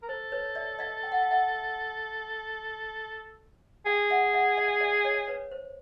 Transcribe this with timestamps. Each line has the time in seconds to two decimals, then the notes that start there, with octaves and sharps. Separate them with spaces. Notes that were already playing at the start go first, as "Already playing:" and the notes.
0.02 A#4
0.08 A4 C5
0.32 B4 C#5
0.55 D5 E5
0.79 D#5 F5
1.03 G5
1.12 F#5
1.22 F5
1.31 E5 F#5
3.86 G#4 F5 G5
4.10 E5 F#5
4.33 E5 F#5
4.57 D#5 F5
4.80 D5 E5
5.05 C#5 D#5
5.27 B4 C#5
5.51 C5